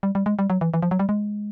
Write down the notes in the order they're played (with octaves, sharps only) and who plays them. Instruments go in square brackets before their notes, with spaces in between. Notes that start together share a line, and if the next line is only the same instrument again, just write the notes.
[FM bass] G3
G3
G#3
G3
F#3
E3
E3
F3
F#3
G3
G#3